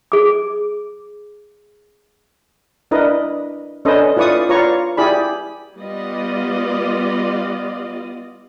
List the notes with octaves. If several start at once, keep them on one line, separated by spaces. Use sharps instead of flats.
G#4 D6
D4 E4 A#4 B4 D#5
C#4 D4 A4 B4 C5 D#5
E4 F4 B4 D5 C#6 D#6
F4 B4 C#5 D5 A#5 C#6
E4 G4 G#4 D5 B5
G3 B3 F4 D5 D#5